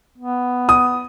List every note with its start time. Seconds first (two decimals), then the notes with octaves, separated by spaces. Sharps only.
0.18 B3
0.69 D#6